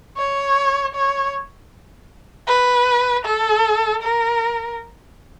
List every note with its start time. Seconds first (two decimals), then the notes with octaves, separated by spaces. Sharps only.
0.17 C#5
0.94 C#5
2.47 B4
3.25 A4
4.02 A#4